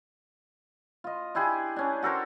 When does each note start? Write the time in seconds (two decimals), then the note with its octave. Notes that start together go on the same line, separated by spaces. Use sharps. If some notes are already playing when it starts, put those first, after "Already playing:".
1.04 F4 D#5
1.35 D4 E4 G4 G#4
1.76 C#4 D4
2.02 F#4 A4 A#4 C5